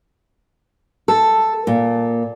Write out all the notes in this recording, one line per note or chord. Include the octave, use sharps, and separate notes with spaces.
A4
A#2